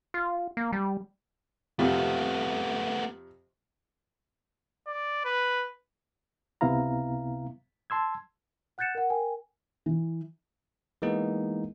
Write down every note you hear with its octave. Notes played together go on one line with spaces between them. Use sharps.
F4
A#3
G3
F2 C3 A3 B3
D5
B4
C#2 C3 B3 E4 F5 A#5
A5 C6 E6 G#6
F#5 F#6 G6 A6 C#7 E7
A#4 F#5
A#4 G5 G#5
E3
E3 G#3 A#3 B3 D#4